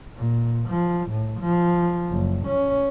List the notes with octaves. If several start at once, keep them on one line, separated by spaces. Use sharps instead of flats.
A#2
F3
A2
F3
F#1
C#4